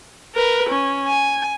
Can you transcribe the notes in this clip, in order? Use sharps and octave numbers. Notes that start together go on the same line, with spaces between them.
A#4 B4
C#4
G#5